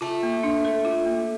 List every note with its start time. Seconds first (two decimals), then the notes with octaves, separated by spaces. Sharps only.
0.01 A3 F4
0.23 A#3
0.43 D4
0.65 A4
0.85 F4
1.06 A#3